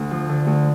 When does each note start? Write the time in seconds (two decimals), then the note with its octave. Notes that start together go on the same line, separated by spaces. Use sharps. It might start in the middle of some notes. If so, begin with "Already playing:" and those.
Already playing: D2
0.11 F3
0.29 D3
0.47 D2